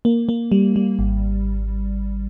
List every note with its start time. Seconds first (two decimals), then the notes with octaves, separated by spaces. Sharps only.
0.05 A#3
0.29 A#3
0.52 G3
0.76 G3
0.99 G#1